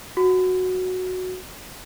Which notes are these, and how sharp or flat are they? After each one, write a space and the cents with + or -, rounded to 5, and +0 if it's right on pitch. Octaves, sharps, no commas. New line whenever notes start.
F#4 -5